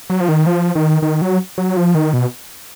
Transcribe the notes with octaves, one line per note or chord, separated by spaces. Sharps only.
F#3
F3
D#3
F3
D#3
D#3
F#3
F#3
F3
D#3
B2